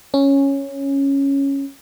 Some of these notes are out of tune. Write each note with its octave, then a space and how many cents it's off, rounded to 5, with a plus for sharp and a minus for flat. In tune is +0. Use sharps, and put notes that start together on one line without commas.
C#4 -5